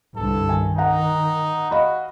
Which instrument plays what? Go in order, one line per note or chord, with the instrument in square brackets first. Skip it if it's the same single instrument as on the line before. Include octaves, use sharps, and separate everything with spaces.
[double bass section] C2 G2 D3 [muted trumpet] A4
[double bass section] D#3 [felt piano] G#5
[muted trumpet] D#4 [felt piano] F#5 A#5
[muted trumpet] F#4 [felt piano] D#5 F5 B5